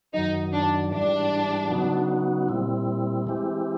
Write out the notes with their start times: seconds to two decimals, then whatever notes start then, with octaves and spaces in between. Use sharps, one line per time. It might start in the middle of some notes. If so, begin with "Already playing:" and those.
0.14 F#2 D#3 F#3 D#4
0.53 D4
0.92 G#2 E3 G3 D4
1.71 C#3 F#3 B3 D#4 F#4
2.48 A#2 G3 C4 E4
3.27 E3 G#3 C4 E4 G4